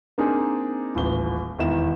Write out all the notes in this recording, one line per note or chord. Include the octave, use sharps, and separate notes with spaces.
A#3 C4 D4 D#4 G#4
D#1 A1 G7
E1 D#3 E4 E7